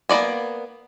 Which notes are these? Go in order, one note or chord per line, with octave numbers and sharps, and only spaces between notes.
A#3 B3 F#4 D5 G#5